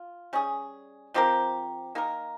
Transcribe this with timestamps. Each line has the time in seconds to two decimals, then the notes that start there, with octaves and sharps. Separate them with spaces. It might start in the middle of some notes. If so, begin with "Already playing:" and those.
Already playing: F4
0.33 G3 C#4 G#4
1.14 F3 C4 G4 A#4
1.95 A#3 D#4 G4 A#4